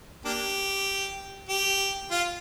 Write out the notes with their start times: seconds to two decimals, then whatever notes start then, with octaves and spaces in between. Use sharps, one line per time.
0.25 A#3 D4 G4
1.49 G4
2.11 F4